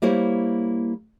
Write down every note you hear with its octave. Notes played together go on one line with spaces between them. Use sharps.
G3 A#3 E4 C5 C#5